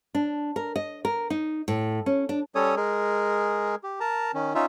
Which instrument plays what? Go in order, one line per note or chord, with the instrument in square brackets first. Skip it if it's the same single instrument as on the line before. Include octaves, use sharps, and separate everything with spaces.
[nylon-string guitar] D4
A#4
D#5
A#4
D#4
A2
C#4
D4
[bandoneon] G3 C#4 A4 C#5 D#6
G#3 G#4 A#4
G4
A#4 A5 A#5
D#3 C#4
C#4 D#4 F4 E5